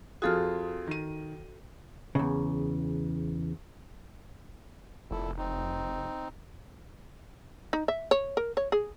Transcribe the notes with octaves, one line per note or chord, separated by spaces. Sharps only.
F2 F4 F#4 G#4 A4 F6
D#3 D#7
E2 C#3
F1 A#2 E4 A4
C4 D#4
D#4
E5
C#5
A#4
C#5
G#4